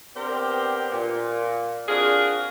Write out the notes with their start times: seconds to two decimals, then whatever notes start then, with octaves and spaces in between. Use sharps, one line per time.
0.15 B3 C4 D4 G4 A#4 C5
0.91 A#2
1.88 C4 D4 F4 F#4 G#4 A#4